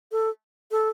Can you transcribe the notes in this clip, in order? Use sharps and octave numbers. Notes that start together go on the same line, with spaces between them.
A4
A4